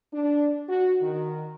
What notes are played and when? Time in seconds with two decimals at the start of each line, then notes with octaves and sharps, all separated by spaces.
0.12 D4
0.68 F#4
1.02 D#3